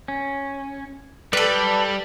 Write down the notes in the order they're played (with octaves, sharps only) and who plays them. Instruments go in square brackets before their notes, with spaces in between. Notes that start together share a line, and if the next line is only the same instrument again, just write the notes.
[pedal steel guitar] C#4
[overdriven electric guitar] G3 [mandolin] A4 B4 [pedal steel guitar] D5